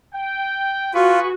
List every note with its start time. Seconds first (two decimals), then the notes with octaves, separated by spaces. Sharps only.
0.15 G5
0.94 F4 F#4 G#4 B4 C#6